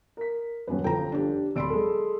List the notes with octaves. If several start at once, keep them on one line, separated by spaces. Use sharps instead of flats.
A#4 B6
D#1 F#2 F#3 B4
G1 F3 A4 G5 A#5
D4 G4
D1 D5 B5 C6 E6 D7
G#3 A4